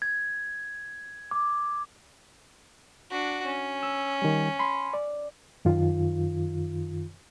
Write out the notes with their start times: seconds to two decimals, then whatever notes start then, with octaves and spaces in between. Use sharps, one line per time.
0.02 G#6
1.31 D6
3.10 D4 F#4
3.45 C#4
3.83 E6
4.22 D#3 G3
4.59 B5 C6
4.94 D5
5.65 F#2 D#3 F4